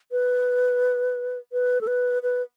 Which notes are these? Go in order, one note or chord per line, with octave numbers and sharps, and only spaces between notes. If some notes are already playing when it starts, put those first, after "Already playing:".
B4
B4
A4
B4
B4